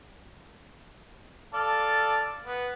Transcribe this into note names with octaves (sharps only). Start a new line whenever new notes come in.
A4 D5 F5
B3